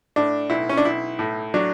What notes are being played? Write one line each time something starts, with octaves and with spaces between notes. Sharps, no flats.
A2 D4
B1 E4
C#4
D4
B1 E4
A2
F#3 D4